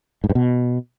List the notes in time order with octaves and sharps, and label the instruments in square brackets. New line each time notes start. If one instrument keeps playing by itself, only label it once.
[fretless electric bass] G#2
G2
B2